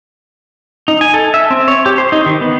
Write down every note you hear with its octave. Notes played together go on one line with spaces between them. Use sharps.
D#4
G#5
A4
E5
C4
C#5
G4
C5
D#4
D#3
B3